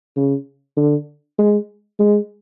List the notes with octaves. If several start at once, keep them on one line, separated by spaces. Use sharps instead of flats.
C#3
D3
G#3
G#3